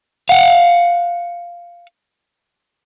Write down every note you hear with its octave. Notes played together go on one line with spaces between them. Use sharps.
F5 F#5